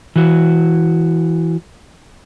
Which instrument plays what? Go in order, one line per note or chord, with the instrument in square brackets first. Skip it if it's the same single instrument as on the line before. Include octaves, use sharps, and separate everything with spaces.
[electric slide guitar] E3 F#4